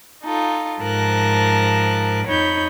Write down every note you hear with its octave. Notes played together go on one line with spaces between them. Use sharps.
D#4 F4 A4
G#2 F3 A#4 A5 F#6 A#6
F2 D#4 C#5 B5 G6